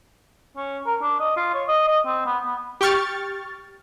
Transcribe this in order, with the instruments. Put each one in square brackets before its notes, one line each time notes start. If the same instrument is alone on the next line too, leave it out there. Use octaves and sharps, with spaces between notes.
[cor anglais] C#4
A#4
D4
D#5
F4
C#5
D#5
D#5
C4
B3
B3
[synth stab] G4 G5 C#6 F6 A6